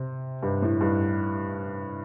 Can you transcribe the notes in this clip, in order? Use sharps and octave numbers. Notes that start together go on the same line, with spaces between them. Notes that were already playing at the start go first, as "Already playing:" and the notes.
Already playing: C3
G2
A2
G2